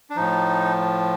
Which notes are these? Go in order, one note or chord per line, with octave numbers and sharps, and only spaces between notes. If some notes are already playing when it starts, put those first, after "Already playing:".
D4
A2 F3 D#4